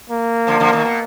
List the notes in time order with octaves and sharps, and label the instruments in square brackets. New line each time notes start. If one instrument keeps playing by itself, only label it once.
[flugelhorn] A#3
[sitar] D3 F3
D3 F3
B2 D#3
B2